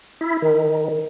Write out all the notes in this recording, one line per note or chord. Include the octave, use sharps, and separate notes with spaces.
E4
D#3